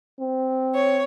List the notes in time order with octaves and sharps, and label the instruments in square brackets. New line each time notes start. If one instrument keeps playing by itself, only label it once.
[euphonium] C4
[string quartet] C#5